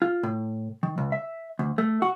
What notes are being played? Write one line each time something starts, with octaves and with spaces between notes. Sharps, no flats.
F4
A2
D#3
C#2
E5
D2
A3
F#4